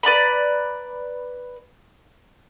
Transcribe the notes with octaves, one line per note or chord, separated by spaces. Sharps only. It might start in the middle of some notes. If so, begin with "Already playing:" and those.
B4 D5 A#5 B5